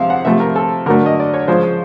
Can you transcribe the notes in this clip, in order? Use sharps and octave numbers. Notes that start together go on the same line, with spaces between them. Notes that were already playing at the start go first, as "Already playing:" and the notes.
Already playing: C3 F3 G#3 E5 F5
F#5
C3 F3 A3 E5
A#4
A4
D3 F#3 A3 A#4
D#5
D5
C#5
C#3 F3 G#3 C5